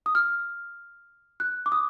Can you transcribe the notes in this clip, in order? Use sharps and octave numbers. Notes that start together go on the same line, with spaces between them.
D#6
F6
F#6
D6
D#6